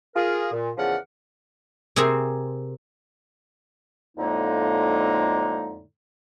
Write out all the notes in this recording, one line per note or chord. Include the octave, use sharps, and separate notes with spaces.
F4 G#4 A#4
A#2
E2 C#3 F3 A#4 D5 F#5
C3 C4 G#4 A#4 C5
F2 A2 D3 G#3 A#3 D#4